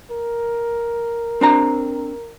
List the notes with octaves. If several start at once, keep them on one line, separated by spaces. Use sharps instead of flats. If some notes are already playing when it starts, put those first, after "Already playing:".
A#4
C4 D4 A#5